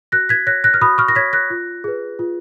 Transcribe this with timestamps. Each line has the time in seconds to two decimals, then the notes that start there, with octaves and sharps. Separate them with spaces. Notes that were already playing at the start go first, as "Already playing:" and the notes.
0.12 F#4 F#6 A#6
0.29 G#6 B6
0.47 C#5 F#6 A#6
0.64 F#6 A#6
0.74 F6
0.81 F#4 B5 D#6
0.98 C#6 F6
1.08 A#6
1.15 C#5 G#6 B6
1.33 F#6 A#6
1.50 F4
1.84 G#4 B4
2.19 F4